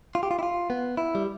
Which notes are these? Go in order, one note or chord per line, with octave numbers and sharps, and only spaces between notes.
F4
G4
F4
E4
F4
B3
E4
G3